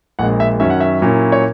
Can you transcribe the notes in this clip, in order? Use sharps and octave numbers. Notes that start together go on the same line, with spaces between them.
A#1 A#2 G#3 F#5
E5
F#2 D#3 F#3 C#4 E5
F#5
E5
A#2 F#3 C#4 E4
C#5